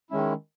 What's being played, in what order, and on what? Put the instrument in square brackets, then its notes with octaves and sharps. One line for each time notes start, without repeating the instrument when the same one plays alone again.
[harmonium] D#3 G#3 C#4 E4